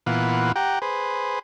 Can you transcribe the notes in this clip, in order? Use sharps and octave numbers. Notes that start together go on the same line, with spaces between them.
A#2 E3 B3 F4 F#5
G4 F#5 G5 A#5
G#4 B4 C5